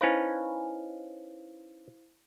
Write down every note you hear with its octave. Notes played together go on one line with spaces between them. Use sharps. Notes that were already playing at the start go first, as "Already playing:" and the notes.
C#4 D#4 E4 B4 C5 F5